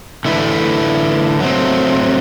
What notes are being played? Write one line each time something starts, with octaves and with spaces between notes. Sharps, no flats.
D3 A3 E4 B4
F#3 A3 C4